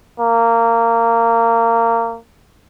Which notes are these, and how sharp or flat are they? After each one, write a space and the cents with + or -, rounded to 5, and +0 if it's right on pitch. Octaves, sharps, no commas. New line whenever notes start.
A#3 -20